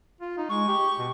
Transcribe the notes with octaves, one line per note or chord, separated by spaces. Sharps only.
F4
D#4
G#3 C#6
G4
B2